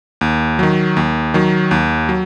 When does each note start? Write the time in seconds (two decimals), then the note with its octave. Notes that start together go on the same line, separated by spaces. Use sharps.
0.21 D#2
0.59 D#3 F#3
0.97 D#2
1.34 D#3 F#3
1.71 D#2
2.09 F#3